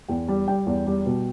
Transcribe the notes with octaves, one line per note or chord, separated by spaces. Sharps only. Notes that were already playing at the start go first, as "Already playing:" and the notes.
E2 G5
G3
G3 G5
E2
G3
B2